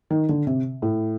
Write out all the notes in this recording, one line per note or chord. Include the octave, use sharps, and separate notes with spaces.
D#3
D3
C3
A2